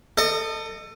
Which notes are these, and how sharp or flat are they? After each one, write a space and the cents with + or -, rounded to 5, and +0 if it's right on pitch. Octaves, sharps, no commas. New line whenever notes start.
A4 +25 D#5 -20